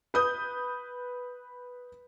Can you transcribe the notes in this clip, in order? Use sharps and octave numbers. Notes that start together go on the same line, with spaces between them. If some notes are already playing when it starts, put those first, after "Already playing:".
B4 D#6 G6